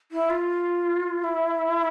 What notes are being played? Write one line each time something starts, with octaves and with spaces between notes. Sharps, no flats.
E4
F4
E4